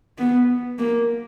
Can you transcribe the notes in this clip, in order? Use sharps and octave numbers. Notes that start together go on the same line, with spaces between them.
B3
A#3